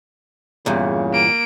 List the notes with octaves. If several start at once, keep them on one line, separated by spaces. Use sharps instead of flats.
E2 G2 A#2 C#3
A#3 D7